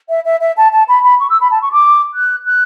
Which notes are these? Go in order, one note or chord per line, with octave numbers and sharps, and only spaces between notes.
E5
E5
E5
A5
A5
B5
B5
C#6
E6
B5
A5
C#6
D6
F#6
F#6